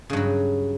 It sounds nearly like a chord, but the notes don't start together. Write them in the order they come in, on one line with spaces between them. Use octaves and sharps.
C#3 G2 F#3